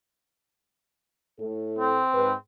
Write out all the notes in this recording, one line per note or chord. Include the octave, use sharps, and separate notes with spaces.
A2 A4
C4
G#2 B4